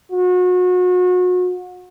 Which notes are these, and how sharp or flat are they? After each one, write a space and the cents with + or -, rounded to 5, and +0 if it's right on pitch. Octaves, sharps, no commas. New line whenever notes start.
F#4 -35